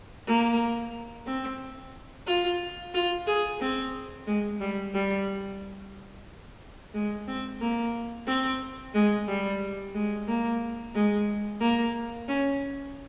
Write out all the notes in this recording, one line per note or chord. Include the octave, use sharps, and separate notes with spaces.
A#3
C4
F4
F4
G#4
C4
G#3
G3
G3
G#3
C4
A#3
C4
G#3
G3
G#3
A#3
G#3
A#3
C#4